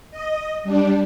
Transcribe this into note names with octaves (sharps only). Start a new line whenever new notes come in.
D#5
G3 D4